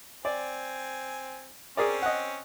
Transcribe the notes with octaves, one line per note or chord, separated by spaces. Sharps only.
C4 D5 G#5
C4 C#4 G#4 A#4 D5
D#5 F#5